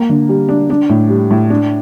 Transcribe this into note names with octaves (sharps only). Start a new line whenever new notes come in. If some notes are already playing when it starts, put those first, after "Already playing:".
Already playing: A#3
D3
G3
D4
D4
A2
G3
A2
D4